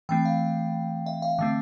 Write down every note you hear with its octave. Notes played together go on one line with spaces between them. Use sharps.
E3 A3 C4 G5
F5
E5
F5
D3 A3 C4